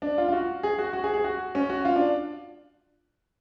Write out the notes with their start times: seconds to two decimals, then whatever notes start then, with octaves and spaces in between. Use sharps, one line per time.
0.02 D4
0.18 F4
0.28 F4
0.33 F#4
0.63 G#4
0.78 F#4
0.93 F#4
1.04 G#4
1.14 G#4
1.24 F#4
1.55 C#4
1.70 F#4
1.85 F4
1.96 D4